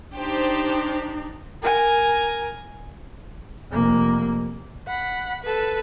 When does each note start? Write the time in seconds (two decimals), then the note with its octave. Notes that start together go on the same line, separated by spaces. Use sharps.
0.17 D4 D#4 G4 C5
1.62 A#4 G#5
3.71 F1 A#3
4.87 F#5 B5
5.44 A4 B4